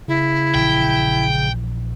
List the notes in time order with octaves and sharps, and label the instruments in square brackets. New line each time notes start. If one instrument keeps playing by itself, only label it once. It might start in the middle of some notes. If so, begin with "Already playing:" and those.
[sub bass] C#3 [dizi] E4
[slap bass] A#1 E3 [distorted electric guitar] G5